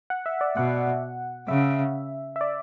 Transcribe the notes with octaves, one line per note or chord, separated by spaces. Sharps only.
F#5
E5
D5
B2 F#5
C#3 E5
E5
D5